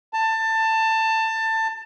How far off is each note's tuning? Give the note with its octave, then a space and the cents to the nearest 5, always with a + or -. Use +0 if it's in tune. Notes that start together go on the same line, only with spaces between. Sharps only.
A5 +20